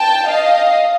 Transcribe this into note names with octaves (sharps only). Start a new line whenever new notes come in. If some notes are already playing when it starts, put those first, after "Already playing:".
Already playing: G5 A5
D#5 F5